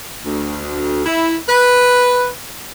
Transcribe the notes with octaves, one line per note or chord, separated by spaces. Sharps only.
D2
E4
B4